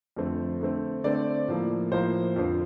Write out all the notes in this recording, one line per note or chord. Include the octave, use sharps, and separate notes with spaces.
F2 D3 A3 C4
D3 A3 C4
D3 A3 C4 D5
A2 F3 A#3
A2 F3 A#3 C5
F2 D3 F3 C4